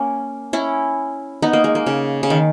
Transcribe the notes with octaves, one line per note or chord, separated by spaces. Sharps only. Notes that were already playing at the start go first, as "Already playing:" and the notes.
Already playing: A#3 C#4
C#4 E4
B3 D#4
A#3
G#3
A#3
C#3
C#3
D#3